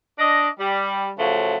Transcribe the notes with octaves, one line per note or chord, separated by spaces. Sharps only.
D4 D#5
G3
C#3 F3 F#3 A3